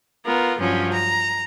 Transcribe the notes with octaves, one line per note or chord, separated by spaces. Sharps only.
B3 F4 A#4
G2 F3 F#3 C#4
A#5